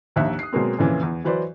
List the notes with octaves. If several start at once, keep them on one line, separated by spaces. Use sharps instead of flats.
A#1 D#2 D#4 E5 F#6
D#6 C7
B2 F#3 G#3 A#3 C4
F2 A#2 C#3 E3
E2
E3 F#3 B4 C5 D5